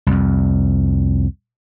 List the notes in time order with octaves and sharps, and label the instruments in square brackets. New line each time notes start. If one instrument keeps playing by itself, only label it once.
[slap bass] C2 F2